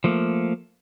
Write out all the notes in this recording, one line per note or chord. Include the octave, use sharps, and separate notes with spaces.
F3 A3 A#3